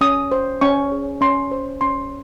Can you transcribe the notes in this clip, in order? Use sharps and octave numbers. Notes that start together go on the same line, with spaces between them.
C#4 D#6
C5
C#4 C#6
G#4
C#4 C6
C5
C#4 C6